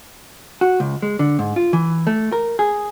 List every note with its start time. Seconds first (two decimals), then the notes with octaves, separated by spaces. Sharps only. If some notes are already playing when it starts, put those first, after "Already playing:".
0.61 F#4
0.80 C#2
1.02 G#3
1.19 D3
1.39 G#2
1.56 F4
1.73 E3
2.07 A3
2.32 A#4
2.59 G#4